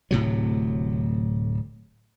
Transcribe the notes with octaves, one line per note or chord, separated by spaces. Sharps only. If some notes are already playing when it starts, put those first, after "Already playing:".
D1 A2 C3 F#3